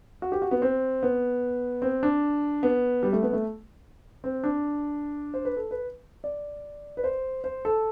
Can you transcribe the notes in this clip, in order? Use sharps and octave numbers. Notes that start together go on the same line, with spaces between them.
F#4
G4
F#4
B3
C4
B3
C4
D4
B3
G3
A3
B3
A3
C4
D4
C5
B4
A4
B4
D5
B4
C5
C5
A4